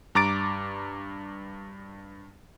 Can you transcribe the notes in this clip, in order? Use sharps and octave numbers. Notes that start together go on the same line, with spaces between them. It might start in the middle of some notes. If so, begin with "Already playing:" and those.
G2 A#5 D6 A6 D7